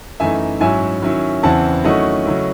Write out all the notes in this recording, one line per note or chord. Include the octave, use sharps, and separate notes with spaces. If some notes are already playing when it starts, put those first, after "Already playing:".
F#2 E3 A3 D#4 E5 G#5
G#2 F#3 C#4 E4 E5 G#5
D#3 F#3 C#4 E4
E2 C#3 E3 C4 E4 F#5 A5
D#3 F#3 A3 C#4 E4 D#5 F#5
C#3 F#3 A3 C#4 E4